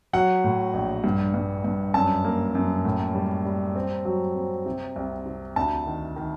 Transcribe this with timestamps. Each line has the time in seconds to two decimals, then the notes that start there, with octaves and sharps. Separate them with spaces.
0.13 F#3 F#5
0.44 A2
0.74 A#1
1.04 G2
1.34 G2
1.64 G2
1.94 F#2 A5
2.24 A#3
2.55 F#2
2.85 A2
3.15 G3
3.45 G3
3.76 C4
4.05 F#3
4.35 C4
4.66 C3
4.96 C2
5.26 C3
5.56 D2 A5
5.86 D#3
6.16 D#3